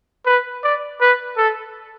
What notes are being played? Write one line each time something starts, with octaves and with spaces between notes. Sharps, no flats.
B4
D5
B4
A4